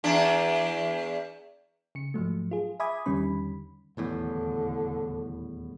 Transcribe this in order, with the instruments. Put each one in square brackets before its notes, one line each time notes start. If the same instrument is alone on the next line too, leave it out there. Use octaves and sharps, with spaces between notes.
[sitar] E2 D4
[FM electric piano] C#3 C#7
G#2 F3 F#3 A3
F4 G#4
E5 G#5 B5 D6 D#6 G#6
E2 D3 D#3 G3 C#4 B5
[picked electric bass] D#1 E2 A2 [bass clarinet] D3